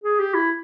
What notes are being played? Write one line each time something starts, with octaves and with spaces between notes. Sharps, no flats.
G#4
G4
E4